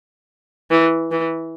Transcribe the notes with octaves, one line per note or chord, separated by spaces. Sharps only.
E3
E3